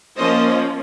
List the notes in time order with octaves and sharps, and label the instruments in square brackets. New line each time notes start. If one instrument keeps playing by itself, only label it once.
[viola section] F3 A#3 C#4 C5 D#5